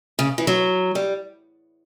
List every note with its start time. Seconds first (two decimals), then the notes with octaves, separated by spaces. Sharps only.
0.19 C#3
0.38 E3
0.47 F#3
0.95 G3